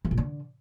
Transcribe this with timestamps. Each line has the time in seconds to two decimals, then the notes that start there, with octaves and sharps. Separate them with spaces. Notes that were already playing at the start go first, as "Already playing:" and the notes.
0.05 E3
0.11 A#2
0.18 D3